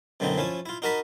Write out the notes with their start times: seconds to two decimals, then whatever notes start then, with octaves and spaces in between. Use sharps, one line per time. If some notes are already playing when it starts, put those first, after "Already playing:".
0.20 F#2 B2 D3 E3 C4 D#4
0.38 F3 C#4 E4 A5
0.66 E4 F4
0.82 D#4 F#4 A#4 D#5 A5 B5